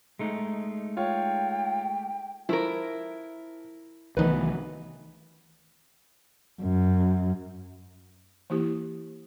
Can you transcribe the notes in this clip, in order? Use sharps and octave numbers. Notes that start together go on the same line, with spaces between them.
G#3 A3 D#4
F4 C#5 G5
F3 E4 A#4
C2 D#3 E3 F#3 A3 B3 D#4 B4
F#2
E3 A#3 E4 G4